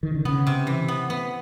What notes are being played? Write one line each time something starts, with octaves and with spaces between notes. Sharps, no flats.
D#3
D3
C#3 B3
C3
E3
B3
B3